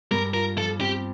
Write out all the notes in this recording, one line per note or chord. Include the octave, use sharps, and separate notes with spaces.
G2 A#4
F4 A#4
F3 A4
C4 G4